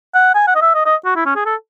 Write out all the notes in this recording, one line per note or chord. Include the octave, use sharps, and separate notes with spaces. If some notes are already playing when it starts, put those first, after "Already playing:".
F#5
G#5
F#5
D#5
E5
D#5
D#5
F#4
E4
C#4
G#4
A4